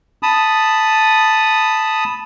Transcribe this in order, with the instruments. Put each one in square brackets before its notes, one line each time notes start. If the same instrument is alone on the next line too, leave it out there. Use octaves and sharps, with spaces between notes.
[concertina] A5 B5 D#6